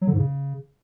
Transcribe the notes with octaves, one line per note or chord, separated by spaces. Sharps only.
F#3
D3
G#2
C#3